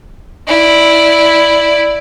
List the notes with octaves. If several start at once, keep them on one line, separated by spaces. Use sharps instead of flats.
E4 D5